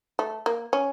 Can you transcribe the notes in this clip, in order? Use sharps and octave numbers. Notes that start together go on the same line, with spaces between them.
A3
A#3
C#4